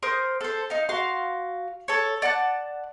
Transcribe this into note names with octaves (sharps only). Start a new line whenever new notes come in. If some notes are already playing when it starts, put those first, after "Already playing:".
A#4 C5 D#6
A4 C5
D#4 F5
F#4 F5 C6
A4 C#5
D5 F#5 A5 F#6